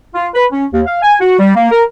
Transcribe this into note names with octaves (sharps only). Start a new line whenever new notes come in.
F4
B4
C#4
D#2
F5
G#5
F#4
G3
A#3
A#4